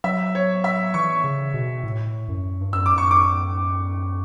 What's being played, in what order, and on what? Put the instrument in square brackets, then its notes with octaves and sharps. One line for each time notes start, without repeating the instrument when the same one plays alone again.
[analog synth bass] F#3 [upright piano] E5
[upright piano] C#5
E5
[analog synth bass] E3 [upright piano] C#6
[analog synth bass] C#3
B2
A2
F#2
G2
[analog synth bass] F#2 [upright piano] E6
[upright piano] D6
C#6
D6